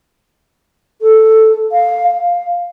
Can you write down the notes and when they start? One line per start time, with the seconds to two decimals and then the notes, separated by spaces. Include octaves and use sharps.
1.01 A4
1.72 F5
2.07 F5